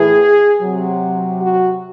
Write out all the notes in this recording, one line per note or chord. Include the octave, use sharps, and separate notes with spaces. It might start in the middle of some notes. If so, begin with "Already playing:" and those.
Already playing: A2 E3 G#4
C3 F#3
F#4